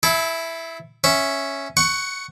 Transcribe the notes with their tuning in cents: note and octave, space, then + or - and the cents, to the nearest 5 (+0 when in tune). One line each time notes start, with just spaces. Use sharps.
E4 +0 A4 -35
C#4 +0 E5 +0
F#5 +15 C#6 +0